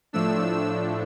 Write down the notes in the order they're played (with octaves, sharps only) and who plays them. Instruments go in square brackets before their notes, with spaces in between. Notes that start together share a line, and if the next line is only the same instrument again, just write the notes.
[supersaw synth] A2 F3 A3 D4 E6